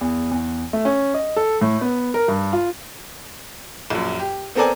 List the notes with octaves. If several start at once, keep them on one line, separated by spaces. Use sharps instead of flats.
E2
E2
A3
C#4
D#5
A4
A2
B3
A#4
G2
F4
A#1 F#2
G4
B3 C4 A4 A#4 D5 G#5